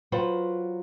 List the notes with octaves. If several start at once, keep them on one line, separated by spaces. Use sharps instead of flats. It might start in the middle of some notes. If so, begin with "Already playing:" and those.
F#3 F4 B4 C5